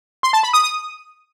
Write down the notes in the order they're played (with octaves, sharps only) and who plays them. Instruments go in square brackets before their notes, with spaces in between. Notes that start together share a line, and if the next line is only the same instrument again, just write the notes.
[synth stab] C6
A5
B5
D#6
D#6